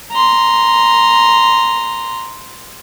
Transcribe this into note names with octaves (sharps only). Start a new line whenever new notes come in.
A#5 C6